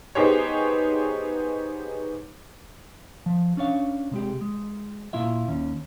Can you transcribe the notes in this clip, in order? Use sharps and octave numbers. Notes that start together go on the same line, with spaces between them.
B3 D#4 G4 G#4 C5 C#5
F3
C#4 D4 C#5 F5
C3 G#3 G4
G#3
A#2 E4 F4 E5
D#2 C#4